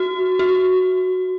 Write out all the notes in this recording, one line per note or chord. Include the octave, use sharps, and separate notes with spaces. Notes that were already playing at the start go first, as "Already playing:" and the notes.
Already playing: F#4
F#4